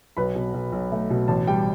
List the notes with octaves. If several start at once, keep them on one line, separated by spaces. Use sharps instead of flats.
B1 B4 B5
B2
B1
B1
A3
B2
A1 A5
G3 G5